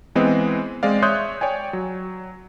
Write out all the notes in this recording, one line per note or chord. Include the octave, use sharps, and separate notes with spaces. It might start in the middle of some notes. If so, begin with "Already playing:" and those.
E3 G#3 B3 C4 D#5
G#3 C4 D5 F5
C#5 E5 C6 D#6 F#6 G6
C#5 D5 G5 G#5
F#3